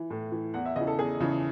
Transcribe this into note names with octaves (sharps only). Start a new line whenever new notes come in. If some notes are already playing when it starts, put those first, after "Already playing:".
Already playing: E3
A2
E3
E2 F#5
E5
C#3 E3 D#5
A4
E2 G#4
C#3 E3